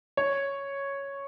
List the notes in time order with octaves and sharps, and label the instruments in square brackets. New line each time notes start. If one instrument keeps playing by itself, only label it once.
[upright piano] C#5